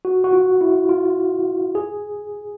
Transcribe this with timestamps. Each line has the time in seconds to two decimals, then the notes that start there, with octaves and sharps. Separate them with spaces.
0.05 F#4
0.24 F#4
0.33 F4
0.61 E4
0.89 F4
1.75 G#4